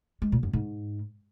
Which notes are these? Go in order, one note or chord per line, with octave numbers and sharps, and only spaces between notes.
G#3
A#2
F#2
G#2